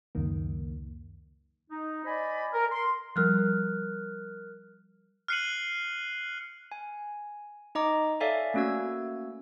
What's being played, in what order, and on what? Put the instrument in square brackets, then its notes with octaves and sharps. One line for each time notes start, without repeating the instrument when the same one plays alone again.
[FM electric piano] C#2 F#2 D#3 A#3
[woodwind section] D#4
C5 D5 D#5 G#5 B5
A#4
C6
[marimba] F3 G3 [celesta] A#4 F6 F#6
[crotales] F6 F#6 C7 C#7 D#7 F#7
[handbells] G#5
D#4 D#5 A#5 D6
A4 C#5 D5 E5 F5 G#5
A3 A#3 C#4 F#4 E6 G#6